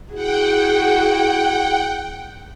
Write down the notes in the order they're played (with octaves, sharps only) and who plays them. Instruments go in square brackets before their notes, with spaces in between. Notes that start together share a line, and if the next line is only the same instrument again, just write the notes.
[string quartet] E4 F#4 G#4 [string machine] F#5 G5